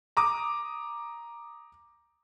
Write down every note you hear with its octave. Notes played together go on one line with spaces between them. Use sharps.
A#5 D6 D#6